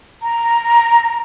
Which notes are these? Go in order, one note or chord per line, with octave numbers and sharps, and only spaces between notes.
A#5